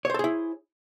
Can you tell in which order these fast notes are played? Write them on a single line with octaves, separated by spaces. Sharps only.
C#5 C5 A4 G#4 E4